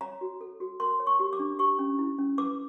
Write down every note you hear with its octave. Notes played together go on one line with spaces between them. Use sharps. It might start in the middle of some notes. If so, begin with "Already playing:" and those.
C#5 A#5
F#4
A4
F#4
A#4 C6
C#5
C#6
G4
D6
D4
G4 C#6
C#4
E4
C#4
B4 D6